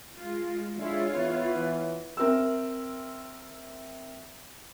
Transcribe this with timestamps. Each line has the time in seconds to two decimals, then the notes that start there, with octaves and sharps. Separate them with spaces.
0.17 G#3 F4
0.79 D3 G#3 E4 F4 C#5
1.15 E2 B3 E4 B4
1.55 E3
2.17 C4 A#4 E5 E6